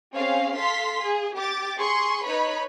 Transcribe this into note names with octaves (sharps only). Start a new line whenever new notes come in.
C4 C#4 G#4 F5
A4 F5 C6 B6
G#4
G4 D6 A6
G#4 C6 C#6
D#4 B4 C#5 B5